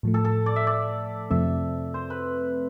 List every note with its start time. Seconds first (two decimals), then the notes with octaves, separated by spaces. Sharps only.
0.03 A2 F3 A3
0.14 A4
0.24 A4
0.46 D5
0.56 E5
0.67 D5
1.30 F2 C3 F3 A3 C4 E5
1.94 C5
2.10 B4